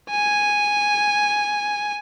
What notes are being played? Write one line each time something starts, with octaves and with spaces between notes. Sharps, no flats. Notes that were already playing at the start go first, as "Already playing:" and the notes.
G#5